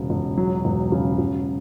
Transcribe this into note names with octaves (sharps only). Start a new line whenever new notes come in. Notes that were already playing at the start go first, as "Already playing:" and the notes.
Already playing: E1 C#3
E1
F#3
E1
C#3
C#3